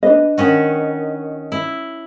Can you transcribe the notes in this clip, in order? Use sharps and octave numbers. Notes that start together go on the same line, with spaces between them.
D4 B4 D#5
D#3 C#4 F#4
E4